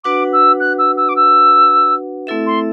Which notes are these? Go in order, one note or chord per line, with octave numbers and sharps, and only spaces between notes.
D4 F#4 B4 F#5 D6
E6
F#6
E6
E6
D6
E6
A3 C4 E4 A4 E5
C6